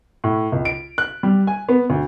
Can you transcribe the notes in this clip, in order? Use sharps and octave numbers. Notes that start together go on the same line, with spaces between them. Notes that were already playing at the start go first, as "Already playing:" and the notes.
A2
C#2
D7
F#6
G3
G#5
B3
D2